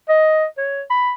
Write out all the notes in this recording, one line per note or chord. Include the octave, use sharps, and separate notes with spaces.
D#5
C#5
B5